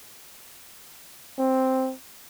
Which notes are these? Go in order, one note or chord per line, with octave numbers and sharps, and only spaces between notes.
C4